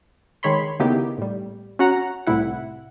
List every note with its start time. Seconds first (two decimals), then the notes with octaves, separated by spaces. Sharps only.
0.43 D#3 G#3 C#5 B5 C6
0.80 C#3 A#3 B3 D#4 E4 G4
1.18 A2 G3
1.79 C#4 F#4 F#5 A#5
2.27 C2 A2 C3 E4 F#5